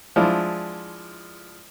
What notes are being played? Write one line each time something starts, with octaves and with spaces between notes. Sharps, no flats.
F3 G#3 D4 E4